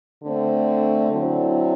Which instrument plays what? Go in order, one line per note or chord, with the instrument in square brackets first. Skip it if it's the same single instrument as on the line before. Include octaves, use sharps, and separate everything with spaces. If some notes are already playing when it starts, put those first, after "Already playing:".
[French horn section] D3 A3 C4
D3 F#3 C4 E4